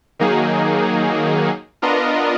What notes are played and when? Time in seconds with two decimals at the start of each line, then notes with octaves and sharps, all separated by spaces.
0.19 D#3 F#3 A#3 D#4 G#4
1.82 B3 D4 F4 A#4 D#5